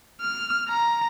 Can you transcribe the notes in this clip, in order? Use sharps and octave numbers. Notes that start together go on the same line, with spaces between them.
F6
A#5